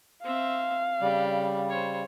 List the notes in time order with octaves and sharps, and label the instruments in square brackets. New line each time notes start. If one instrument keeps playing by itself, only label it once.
[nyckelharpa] C4 E5 [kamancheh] F5
[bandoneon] C#3 G3 [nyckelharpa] G4 D5
[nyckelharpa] C5 C#5